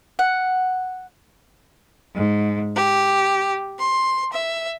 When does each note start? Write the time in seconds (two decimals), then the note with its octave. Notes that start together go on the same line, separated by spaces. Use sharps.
0.19 F#5
2.15 G#2
2.77 G4
3.80 C6
4.34 E5